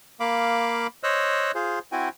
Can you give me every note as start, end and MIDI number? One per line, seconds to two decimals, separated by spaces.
0.20 0.87 58
0.20 0.87 77
0.20 0.87 83
0.20 0.87 86
1.03 1.52 72
1.03 1.52 73
1.03 1.52 75
1.03 1.52 88
1.03 1.52 90
1.55 1.79 65
1.55 1.79 68
1.55 1.79 72
1.92 2.09 60
1.92 2.09 64
1.92 2.09 66
1.92 2.09 79
1.92 2.09 80